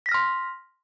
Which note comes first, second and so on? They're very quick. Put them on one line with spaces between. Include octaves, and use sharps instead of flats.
B6 A#6 F6 C6